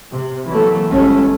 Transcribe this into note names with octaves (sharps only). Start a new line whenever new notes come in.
C3
E3 F#3 A3 A#3
G1 G#3 A3 C#4